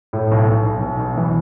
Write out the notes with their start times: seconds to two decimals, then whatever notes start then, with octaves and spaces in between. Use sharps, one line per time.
0.13 A2
0.31 B1
0.48 B1
0.66 B1
0.82 B1
0.99 B1
1.17 E3